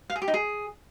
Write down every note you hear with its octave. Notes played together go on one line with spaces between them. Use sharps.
F5
G#4
G4
D#4
G#4